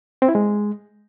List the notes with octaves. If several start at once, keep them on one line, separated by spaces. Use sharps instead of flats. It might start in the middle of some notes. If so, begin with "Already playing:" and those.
C4
E4
G#3